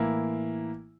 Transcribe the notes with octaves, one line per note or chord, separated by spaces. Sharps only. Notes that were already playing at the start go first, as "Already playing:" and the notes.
Already playing: A2 E3 A#3 E4